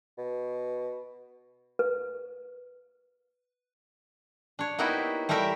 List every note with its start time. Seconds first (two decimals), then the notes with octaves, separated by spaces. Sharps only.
0.18 B2
1.79 B4
4.59 D4 C#5
4.79 A#3 B3 D#4 E4 F#4 G4
5.29 G3 A3 G4 A#4 E5